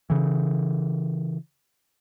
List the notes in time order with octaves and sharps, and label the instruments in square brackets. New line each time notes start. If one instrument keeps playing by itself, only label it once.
[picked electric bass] C#3 E3